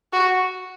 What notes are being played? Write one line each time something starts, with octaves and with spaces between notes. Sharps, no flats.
F#4